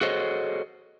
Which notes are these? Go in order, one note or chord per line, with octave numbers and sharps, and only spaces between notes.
F#4 G#4 A4 C5 C#5 D#5